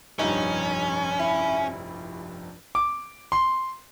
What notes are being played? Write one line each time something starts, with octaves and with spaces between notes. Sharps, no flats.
F1 A#1 G2 C#4 D#4
E4
D6
C6